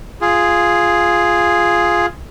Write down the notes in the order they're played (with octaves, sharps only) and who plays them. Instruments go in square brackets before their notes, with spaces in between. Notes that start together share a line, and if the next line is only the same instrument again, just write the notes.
[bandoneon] F4 G#4